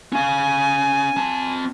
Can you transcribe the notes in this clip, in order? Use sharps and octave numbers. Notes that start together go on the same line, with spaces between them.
C#4 F5 G#5
C4 A5